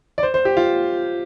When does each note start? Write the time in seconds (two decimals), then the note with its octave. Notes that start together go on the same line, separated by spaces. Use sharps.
0.18 D5
0.23 C5
0.34 C5
0.45 G4
0.57 F4